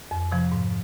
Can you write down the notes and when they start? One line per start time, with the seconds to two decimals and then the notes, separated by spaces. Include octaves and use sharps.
0.11 F2
0.32 C3 F3
0.52 G#2